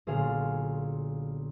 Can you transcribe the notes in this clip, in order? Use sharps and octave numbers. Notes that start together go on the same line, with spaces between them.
B1 A#2 D3 D4 G#4 F5